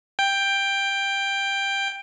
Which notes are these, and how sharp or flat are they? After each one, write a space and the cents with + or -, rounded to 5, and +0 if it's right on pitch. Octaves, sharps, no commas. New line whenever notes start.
G5 +10